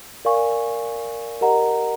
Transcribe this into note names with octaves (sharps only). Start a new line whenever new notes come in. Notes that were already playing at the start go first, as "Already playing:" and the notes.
A#4 D5 F5 G#5 C#6
G4 A#4 D#5 F#5 A#5